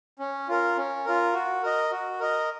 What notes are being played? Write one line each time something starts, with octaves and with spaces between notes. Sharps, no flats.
C#4
F4 A#4
C#4
F4 A#4
F#4
A#4 D#5
F#4
A#4 D#5